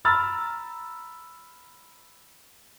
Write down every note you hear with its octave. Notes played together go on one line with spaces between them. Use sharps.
A#5 B5 E6 F6 A6